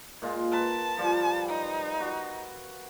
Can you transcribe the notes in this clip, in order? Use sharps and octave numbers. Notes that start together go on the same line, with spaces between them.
A#2 G#3 F4
A#4 B4 A5
F3 G3 F4
D#4
F#4